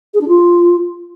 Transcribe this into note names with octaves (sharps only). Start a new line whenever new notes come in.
G#4
D4
F4